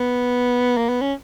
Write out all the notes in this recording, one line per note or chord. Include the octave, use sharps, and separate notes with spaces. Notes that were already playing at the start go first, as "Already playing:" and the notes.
Already playing: B3
A#3
B3
C#4